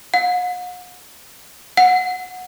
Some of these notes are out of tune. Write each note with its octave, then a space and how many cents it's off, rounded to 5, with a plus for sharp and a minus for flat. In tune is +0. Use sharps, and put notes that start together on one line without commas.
F#5 -45
F#5 -15